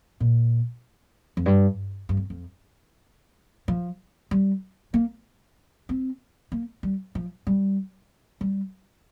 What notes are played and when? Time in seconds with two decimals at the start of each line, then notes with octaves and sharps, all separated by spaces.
0.20 A#2
1.37 F2
1.46 G2
2.09 G2
2.17 F2
2.30 F2
3.68 F3
4.31 G3
4.94 A#3
5.89 C4
6.52 A#3
6.83 G3
7.15 F3
7.47 G3
8.41 G3